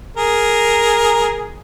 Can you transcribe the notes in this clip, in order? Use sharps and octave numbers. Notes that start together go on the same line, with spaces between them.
G#4 A#4